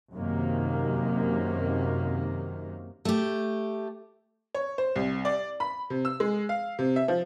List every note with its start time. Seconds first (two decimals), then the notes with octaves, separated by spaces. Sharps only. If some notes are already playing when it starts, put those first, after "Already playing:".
0.13 F#2 C3 D#3 A#3
3.05 A3 G4
4.54 C#5
4.78 C5
4.96 C2
5.25 D5
5.60 B5
5.90 C3
6.05 E6
6.20 G#3
6.49 F5
6.79 C3
6.96 E5
7.08 F3